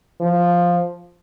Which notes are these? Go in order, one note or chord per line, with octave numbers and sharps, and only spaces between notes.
F3